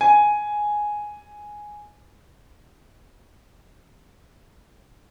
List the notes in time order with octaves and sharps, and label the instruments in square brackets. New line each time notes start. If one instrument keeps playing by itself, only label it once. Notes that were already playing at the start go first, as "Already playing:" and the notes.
[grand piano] G#5